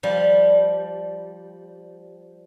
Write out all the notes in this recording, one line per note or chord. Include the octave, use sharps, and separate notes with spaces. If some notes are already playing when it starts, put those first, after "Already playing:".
F3 G3